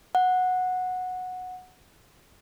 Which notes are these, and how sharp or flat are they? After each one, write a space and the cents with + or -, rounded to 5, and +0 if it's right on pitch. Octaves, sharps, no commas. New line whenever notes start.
F#5 -10